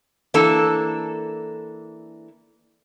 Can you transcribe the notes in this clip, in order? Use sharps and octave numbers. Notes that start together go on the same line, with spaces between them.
E3 A#3 D4 A4